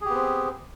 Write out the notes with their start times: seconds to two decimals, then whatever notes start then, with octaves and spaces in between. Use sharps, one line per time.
0.01 G#4
0.05 G4
0.10 B3
0.14 C4